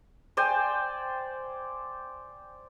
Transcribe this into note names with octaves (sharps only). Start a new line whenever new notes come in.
C5 D5 G5 G#5